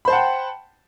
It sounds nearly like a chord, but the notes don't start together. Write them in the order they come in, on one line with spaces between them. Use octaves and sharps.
B5 C5 A5 F#5 G5